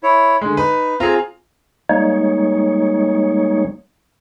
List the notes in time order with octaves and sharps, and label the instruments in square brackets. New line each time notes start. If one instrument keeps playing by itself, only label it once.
[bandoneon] E4 C#5
[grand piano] D3 G#3
[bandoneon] D#4 [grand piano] B4
[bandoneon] C4 A#5 [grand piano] F4 G#4
[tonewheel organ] G3 G#3 A#3 D#4 C#5